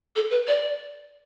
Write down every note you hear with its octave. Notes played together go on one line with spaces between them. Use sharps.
A4
B4
D5